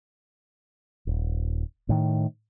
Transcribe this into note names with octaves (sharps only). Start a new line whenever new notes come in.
D#1
A2 D#3